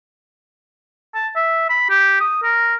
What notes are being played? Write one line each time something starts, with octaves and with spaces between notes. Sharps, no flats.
A5
E5
B5
G4
D#6
A#4